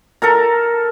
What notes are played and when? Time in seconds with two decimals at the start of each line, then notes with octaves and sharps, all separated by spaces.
0.22 A4 A#4 A#5